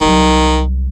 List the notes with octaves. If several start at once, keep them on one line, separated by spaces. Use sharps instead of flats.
C2 D#3 F#3